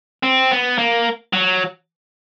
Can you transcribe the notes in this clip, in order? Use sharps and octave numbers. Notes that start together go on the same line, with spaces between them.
C4
B3
A#3
F#3